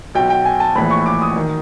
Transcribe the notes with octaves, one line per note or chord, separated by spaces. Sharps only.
B1 B2 G5
G5
G#5
A5
A#1 A2 E3 B5
C#6
D6
D#6
D#3